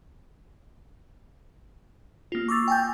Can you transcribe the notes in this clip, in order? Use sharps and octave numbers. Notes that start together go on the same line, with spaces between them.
A#3 F4
C#6 D6 E6 A6
G5 G#5 G6